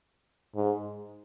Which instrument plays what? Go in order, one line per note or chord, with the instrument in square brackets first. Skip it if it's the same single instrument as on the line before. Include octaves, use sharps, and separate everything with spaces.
[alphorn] G#2